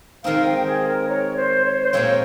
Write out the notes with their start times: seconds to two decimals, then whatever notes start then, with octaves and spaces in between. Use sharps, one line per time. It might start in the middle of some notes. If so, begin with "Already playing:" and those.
0.23 D#3 G#3 C4 D#4 F5
0.46 G5
0.66 G#4
0.88 A#4
1.08 C#5
1.36 C5
1.65 C#5
1.82 C5
1.93 A#2 G#3 C4 F4 C#5